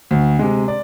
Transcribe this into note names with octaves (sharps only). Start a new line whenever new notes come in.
D2
C3 G#3
D5